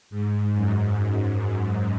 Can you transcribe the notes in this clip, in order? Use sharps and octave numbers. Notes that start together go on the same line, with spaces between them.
G#2
F#2